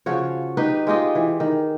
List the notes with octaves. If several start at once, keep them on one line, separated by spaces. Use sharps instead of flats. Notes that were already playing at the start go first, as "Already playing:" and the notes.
C#3 F3 F#4 C#5
D#4 G4 B4
G#3 F4 G4 D#5
E3
D#3